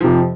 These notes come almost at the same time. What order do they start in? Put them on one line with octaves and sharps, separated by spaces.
F3 C3 F2